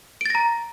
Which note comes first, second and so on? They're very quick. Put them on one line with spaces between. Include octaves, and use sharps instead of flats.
D7 A6 A#6 A#5